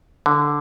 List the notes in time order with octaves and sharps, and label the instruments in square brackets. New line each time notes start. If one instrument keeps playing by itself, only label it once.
[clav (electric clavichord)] D3